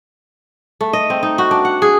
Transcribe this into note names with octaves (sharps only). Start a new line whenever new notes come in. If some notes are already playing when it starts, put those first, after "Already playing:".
A3
D#5
C4
D#4
F#4
D4
F#5
G#4